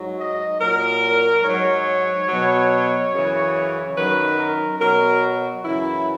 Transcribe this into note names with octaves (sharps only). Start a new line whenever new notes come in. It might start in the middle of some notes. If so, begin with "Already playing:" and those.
Already playing: G#2 F#3
D#5
A#2 F#3 A#4
G#2 F#3 C#5
B2 F#3
F#2 C#3 E3
F#2 D#3 F#3 B4
A#4
B2 F#3 A#4
F#4
F#2 C#3 E3 E4